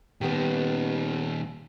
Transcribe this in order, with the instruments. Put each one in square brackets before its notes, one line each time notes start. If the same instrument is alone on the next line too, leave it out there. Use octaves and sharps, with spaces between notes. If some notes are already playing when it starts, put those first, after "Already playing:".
[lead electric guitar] A#2 D#3 [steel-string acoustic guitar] B3 G4